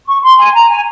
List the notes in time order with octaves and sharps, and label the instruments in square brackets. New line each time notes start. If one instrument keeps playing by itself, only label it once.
[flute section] C#6
C6
G#5
A#5
G#5